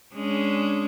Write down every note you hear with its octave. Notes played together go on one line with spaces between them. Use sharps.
G#3 C#4 D4